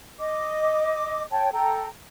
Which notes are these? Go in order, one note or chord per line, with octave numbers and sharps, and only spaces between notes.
D#5 D6
C#5 G5 A5
A4 G5 A#5